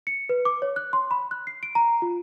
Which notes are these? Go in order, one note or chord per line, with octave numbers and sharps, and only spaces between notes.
C#7
B4
D6
C#5
F#6
C6
B5
F#6
C7
D7
A#5
F4